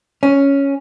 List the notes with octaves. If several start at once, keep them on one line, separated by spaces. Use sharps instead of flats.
C#4